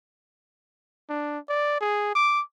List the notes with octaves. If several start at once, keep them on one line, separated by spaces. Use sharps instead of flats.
D4
D5
G#4
D6